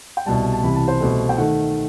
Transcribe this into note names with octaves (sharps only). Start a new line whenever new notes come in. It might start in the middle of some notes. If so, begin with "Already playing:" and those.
G5
C2 B2 G3 A5
A5
C2 C3 E3 B5
A5
C5
C2 B2 A3
G5
D#3 A3 F#5